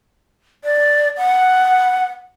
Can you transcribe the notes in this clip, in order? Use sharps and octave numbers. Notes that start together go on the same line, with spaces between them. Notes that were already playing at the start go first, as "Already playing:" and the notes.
D5
F#5